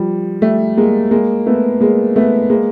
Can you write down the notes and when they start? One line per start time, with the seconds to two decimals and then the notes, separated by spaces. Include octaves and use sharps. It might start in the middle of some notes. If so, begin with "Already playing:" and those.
Already playing: F3 G3
0.42 G3 A3
0.77 G#3 A#3
1.11 G#3 A#3
1.46 A3 B3
1.81 G#3 A#3
2.16 A3 B3
2.50 G#3 A#3